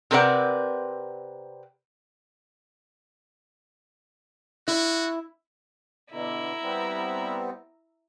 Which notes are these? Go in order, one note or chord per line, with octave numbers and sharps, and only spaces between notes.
C3 C4 A#4 B4 D5 F#5
E4 F#4
B2 D3 E4 A#5
G3 B3 C4